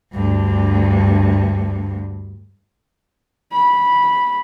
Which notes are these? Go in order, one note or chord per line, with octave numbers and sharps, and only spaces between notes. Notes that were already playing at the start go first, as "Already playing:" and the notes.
D2 G2
B5